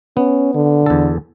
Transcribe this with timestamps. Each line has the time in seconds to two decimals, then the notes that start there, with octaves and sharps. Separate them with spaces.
0.17 B3 C#4
0.55 D3
0.86 E2 A4